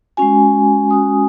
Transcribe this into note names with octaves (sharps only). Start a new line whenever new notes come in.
G#3 C#4 F#4 G#5
G#3 C#4 F#4 D#6